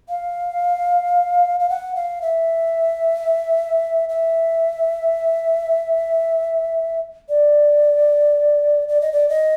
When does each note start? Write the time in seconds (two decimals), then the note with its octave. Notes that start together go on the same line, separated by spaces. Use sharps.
0.09 F5
1.60 F5
1.70 F#5
1.95 F5
2.22 E5
4.09 E5
7.29 D5
8.88 D5
9.01 D#5
9.13 D5
9.29 D#5